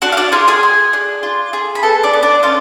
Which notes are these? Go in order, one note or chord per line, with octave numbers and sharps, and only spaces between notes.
D4 F#4 F#5
F5
D4 D5
F4 G#4 F5
G#4 G#5
G#4
D4
F4
G#4
B5
B3 A4 A5
D4 D5
B3
D4 D5
C#4 F4 F5